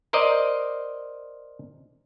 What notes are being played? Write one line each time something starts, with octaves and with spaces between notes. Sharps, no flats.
A#4 C5 D5 D#5